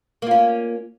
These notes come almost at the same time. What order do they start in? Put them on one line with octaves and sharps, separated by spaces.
A#3 F4 C#4